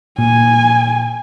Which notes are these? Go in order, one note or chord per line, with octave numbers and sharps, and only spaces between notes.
A#2 G#5